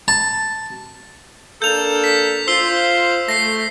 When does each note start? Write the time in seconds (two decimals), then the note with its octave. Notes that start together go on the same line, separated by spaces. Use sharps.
0.08 A5
1.62 A#3 D4 A4 G6 F7
2.04 B6
2.48 F4 C5 E6 C7 G7
3.28 A3 A#6 C7